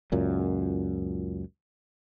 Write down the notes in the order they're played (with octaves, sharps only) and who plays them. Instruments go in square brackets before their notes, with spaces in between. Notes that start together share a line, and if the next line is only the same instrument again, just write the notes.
[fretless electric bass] C#2 F#2 A#2